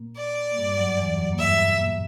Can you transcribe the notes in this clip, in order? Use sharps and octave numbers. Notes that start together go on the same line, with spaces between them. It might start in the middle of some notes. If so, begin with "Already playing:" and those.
Already playing: A#2 A#3
D5
A#3
G2 G3
F#2 F#3
E2 E3
F#2 F#3
A#3
G2 G3 E5
B2 B3
A#2 A#3